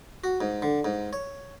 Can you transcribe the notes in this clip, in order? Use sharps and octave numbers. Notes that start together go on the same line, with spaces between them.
F#4
G#2
D3
G#2
C#5